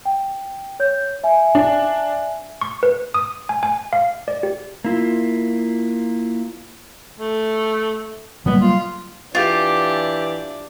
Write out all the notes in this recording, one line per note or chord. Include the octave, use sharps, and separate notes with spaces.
G5
C#5 G6
E5 G#5
D4
C#6
B4
D#6
G#5
G#5
F5
D5
G4
A#3 E4 F4
A3
F#3 G3 A#3 B3
F4
E3 D4 F4 G4